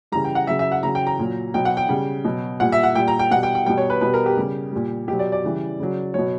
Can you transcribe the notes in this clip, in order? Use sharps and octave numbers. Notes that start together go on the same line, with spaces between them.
C#3 E3 G3 A#5
G5
F#5
C#3 F#3 E5
E5
F#5
C#3 F#3 A#5
G5
A#5
A#2 F#3
B2 F#3 G5
F#5
G5
C#3 G3
B2 F#3
A#2 G3 F#5
E5
F#5
A#2 G3 G5
A#5
G5
B2 G3 F#5
G5
G5
B2 G3 G5
C#5
B4
B2 G3 B4
A#4
G4
C#3 G3
A#2 G3
B2 F#3 G4
D5
D5
C#3 E3 G3
C#3 F#3
B2 F#3 C#5